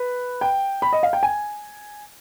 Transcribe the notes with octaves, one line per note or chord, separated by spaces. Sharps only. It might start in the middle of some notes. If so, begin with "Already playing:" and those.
Already playing: B4
G5
B5
D#5
F5
G5
G#5